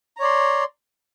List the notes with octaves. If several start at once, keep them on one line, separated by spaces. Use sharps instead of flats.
C#5 D5 A#5 C6